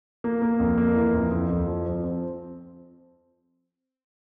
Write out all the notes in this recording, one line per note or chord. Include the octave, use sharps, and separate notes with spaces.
A#3
A#3
F2
A#3
E3
F2
F2
F2
F3
F3
C4